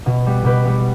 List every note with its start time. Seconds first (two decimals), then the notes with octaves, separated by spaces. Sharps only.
0.06 B2
0.26 G3 B3
0.44 B2 G4 B4
0.65 G3 B3